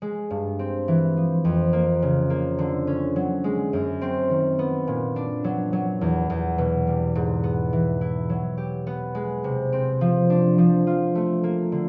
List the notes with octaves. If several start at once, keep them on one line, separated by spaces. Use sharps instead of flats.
G#3
G2
C4
E3
F3
F2
A#3
C#3
A#3
D3
C#4
F#3
G#3
F#2
C4
D#3
B3
A#2
D4
F#3
F#3
E2
E2
B2
G3
G#2
B3
E3
E4
F#3
G4
B3
G#3
C3
C4
F3
D4
F3
F4
A3
A#3
D3